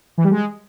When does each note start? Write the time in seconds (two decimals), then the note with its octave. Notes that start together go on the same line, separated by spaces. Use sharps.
0.18 E3
0.24 G3
0.31 G#3